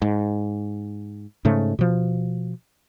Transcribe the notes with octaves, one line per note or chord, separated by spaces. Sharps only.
G#2
G#2 C#3 A3
B2 F3